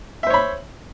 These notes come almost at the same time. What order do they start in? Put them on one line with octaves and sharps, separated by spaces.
E5 C5 C#5 B5